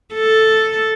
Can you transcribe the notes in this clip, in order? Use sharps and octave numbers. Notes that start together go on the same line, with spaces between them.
A4